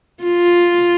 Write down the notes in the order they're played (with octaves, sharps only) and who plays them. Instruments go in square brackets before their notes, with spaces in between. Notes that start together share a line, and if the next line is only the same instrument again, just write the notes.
[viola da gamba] F4